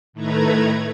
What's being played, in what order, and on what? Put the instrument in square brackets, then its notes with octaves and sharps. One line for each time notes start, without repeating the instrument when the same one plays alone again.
[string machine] A2 D#3 A3 B4 A#5 G#6